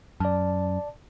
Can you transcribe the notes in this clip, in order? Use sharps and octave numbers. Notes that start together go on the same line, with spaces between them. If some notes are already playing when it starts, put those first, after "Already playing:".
F#2 D5 A5